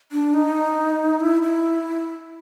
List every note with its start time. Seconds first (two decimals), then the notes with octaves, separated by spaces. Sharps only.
0.12 D4
0.34 D#4
1.20 E4
1.42 E4